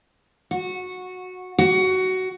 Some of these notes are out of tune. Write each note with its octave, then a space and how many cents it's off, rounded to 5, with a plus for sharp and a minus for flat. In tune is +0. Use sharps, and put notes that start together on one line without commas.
F#4 -15
F#4 +15